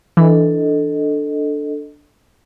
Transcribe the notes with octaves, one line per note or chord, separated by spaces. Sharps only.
E3 D4 A4 D#5